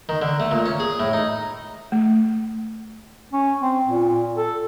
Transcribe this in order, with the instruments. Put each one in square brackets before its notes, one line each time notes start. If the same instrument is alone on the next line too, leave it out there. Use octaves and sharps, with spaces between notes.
[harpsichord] D#3
D3
A3
A#2
C#4
G#4
A2
D#4
[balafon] A3
[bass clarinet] C#4
C4
A#2
A4